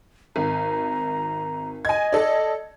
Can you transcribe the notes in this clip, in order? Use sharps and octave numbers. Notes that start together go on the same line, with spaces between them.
G#1 A#5
D#5 G#5 G#6
A4 D5